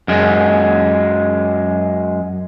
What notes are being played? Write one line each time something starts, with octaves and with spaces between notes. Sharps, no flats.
F#2 G#3